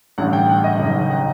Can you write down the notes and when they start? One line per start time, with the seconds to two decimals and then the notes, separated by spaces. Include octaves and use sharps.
0.18 A1 G2 D3 F#5
0.33 G5
0.49 F#5
0.64 D#5
0.79 F#1 F#2 D#3
1.02 G5
1.10 F#5